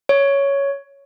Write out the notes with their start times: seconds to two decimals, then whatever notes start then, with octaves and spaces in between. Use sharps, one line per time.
0.09 C#5